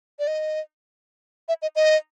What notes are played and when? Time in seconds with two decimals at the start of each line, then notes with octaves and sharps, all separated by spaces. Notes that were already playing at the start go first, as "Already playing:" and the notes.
0.19 D5
0.27 D#5
1.48 E5
1.62 D#5
1.76 D#5